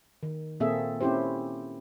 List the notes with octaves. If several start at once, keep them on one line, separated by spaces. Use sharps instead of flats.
D#3
A#2 A#3 C4 G#4 A4 E5
C4 C#4 E4 G4 C5